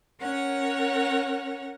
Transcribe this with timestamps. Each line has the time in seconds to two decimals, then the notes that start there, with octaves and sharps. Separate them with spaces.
0.21 C#4 A#4 C#5 F#5